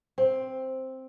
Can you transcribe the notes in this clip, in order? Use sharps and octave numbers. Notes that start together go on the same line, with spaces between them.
C4